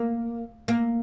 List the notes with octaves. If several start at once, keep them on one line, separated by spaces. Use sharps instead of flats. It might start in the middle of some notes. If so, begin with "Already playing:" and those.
Already playing: A#3
A#3